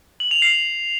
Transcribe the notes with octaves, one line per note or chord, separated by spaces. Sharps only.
F#7
F7
C7